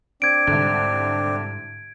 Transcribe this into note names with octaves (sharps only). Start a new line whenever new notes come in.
C4 D4 G#6 D7
C2 G#2 D3